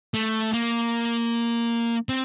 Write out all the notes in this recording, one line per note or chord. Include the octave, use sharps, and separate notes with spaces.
A3
A#3
C4